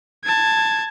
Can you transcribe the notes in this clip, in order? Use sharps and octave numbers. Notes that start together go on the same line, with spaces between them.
A5 G#6